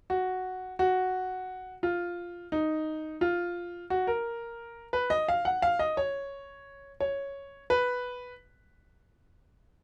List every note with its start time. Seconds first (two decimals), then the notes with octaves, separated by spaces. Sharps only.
0.10 F#4
0.79 F#4
1.83 F4
2.52 D#4
3.21 F4
3.90 F#4
4.07 A#4
4.93 B4
5.10 D#5
5.28 F5
5.45 F#5
5.62 F5
5.79 D#5
5.97 C#5
7.01 C#5
7.70 B4